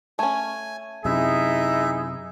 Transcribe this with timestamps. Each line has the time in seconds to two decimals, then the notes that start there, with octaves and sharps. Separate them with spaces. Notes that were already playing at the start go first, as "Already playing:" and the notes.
0.19 A3 C#4 G#5
1.05 F#2 C3 D#4 E4 G#4 E5